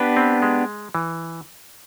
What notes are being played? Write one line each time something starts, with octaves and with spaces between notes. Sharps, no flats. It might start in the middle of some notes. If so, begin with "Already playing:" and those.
Already playing: B3 D4 G4 B4
C4
G#3
E3